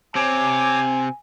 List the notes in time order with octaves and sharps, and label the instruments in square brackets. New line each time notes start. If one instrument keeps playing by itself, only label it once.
[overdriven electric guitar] C3 C4 [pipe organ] C#5 D6 [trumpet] G#5